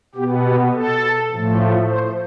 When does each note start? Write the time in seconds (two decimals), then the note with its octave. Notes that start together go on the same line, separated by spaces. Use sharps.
0.15 B2 B3 G4
0.45 G4
0.74 A4
1.32 A2 F3 A3
1.90 C5